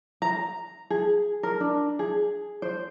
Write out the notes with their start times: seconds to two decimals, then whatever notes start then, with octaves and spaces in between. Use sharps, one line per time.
0.22 A#5
0.90 G#4
1.43 A#4
1.60 D4
1.99 G#4
2.62 C5